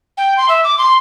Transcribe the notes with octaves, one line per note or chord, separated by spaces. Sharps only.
G5
C6
E5
D6
C6